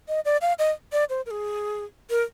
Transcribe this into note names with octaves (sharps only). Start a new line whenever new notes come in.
D#5
D5
F5
D#5
D5
C5
A#4
G#4
A#4